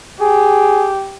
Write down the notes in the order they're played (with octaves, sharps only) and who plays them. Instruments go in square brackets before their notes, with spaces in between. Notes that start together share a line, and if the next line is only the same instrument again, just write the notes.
[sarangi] G4 [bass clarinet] G#4